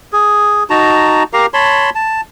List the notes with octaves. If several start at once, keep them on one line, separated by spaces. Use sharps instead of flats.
G#4
D#4 F#4 A5 A#5
G4 A#4 F5 A#5
C#5 A5 B5 C6
A5